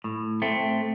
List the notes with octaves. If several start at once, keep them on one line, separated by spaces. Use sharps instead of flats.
A2
A3 C4